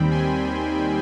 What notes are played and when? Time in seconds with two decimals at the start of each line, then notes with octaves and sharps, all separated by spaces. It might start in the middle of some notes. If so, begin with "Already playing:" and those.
Already playing: D#2 D#3 G3 C4 G5 B5
0.11 G#5 C6